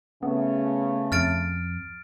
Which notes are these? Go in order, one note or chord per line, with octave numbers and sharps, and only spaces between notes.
C#3 A3 B3
F2 F6 A6 D7